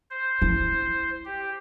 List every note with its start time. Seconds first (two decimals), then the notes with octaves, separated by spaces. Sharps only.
0.10 C5
0.42 E4
1.25 G4